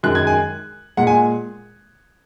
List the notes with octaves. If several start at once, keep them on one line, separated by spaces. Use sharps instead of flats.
F#2 D#3 G#3 F#6
G#6
G#5
A#2 G#3 F#5
G#5